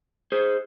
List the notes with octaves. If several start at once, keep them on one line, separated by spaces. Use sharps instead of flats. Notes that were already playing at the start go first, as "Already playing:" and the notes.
G#4 C5